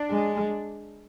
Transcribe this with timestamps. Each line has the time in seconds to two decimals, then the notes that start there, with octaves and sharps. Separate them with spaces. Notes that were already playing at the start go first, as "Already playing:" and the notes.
Already playing: D4
0.11 G#3